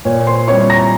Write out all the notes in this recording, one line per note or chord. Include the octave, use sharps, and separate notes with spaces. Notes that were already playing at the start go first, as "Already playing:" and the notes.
A#2 C#5
C5 C6
G3 C4 E4 C#5 C#6
A#5 A#6